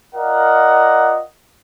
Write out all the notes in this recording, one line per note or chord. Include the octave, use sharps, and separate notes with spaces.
F4 A#4 D5 D#5 F5 F#5